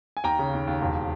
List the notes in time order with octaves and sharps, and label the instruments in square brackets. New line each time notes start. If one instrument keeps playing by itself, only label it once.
[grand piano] G#5
D#2 G5 A#5
C#3
D#2
D#2
E1